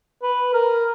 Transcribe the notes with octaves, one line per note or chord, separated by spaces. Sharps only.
B4
A#4